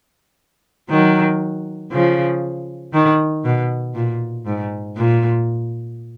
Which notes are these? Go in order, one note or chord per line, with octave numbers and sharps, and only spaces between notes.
D#3 F#3
C#3 F3
D#3
B2
A#2
G#2
A#2